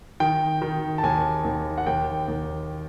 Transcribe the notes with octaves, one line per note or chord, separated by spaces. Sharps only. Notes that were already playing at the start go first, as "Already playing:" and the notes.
D#3 G5
D#3
A5
D#2 G#5
D#2
F#5
D#2 G5
D#2